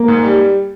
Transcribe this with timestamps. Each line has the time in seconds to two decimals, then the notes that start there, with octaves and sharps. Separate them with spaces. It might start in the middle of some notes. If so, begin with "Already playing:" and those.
Already playing: A#3
0.08 G#2
0.23 G3